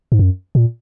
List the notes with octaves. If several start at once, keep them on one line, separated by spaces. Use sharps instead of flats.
G#2
F#2
A#2